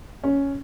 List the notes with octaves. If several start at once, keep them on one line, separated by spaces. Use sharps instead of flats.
C#4